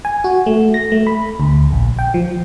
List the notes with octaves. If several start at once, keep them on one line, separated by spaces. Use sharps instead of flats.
G#5
F#4
A3
A#6
A3
B5
D2
A#1
G5
F3